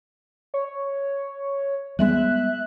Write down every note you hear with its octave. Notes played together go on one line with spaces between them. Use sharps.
C#5
G3 G#3 B3 E5 F#6